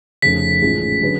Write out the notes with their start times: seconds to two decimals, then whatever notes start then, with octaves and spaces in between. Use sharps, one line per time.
0.22 F1 F2 C#3 B6
0.62 A1 G#2 G#3 C#4 F4
1.01 D3 F#3 C#4 G#4 B4